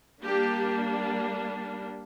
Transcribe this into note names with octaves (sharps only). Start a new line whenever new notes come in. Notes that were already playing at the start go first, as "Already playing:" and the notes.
G3 A#3 D4 G4